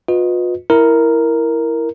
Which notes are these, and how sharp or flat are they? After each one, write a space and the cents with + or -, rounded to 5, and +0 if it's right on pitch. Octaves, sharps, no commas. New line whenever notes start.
F4 +45 B4 +0 D#5 +0
E4 +0 A#4 +0